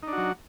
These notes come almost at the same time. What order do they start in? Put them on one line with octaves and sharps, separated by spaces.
D#4 D4 F#4 F#3